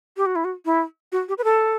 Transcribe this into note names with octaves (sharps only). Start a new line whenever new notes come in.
G4
F#4
E4
F#4
E4
F#4
G4
B4
A4